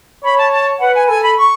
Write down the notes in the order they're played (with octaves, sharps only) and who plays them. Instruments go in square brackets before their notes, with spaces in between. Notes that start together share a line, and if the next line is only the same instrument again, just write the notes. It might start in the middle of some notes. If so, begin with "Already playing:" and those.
[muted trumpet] C#5 [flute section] B5
[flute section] A5
A5
[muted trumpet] B4 [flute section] F#5
[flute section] G#5
[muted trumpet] A4 [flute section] G#5
[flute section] B5
C#6